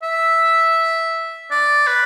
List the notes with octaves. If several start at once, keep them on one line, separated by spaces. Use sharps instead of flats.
E5
D5
B4